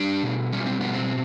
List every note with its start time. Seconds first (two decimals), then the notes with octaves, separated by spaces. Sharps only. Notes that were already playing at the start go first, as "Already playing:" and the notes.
Already playing: G3 D4
0.23 B2
0.52 G3 C#4
0.66 C4
0.80 B2 B3
0.94 C4